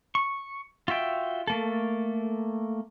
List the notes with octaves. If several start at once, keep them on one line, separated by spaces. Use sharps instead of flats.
C#6
F4 F#4 E5 G5
A3 A#3 A4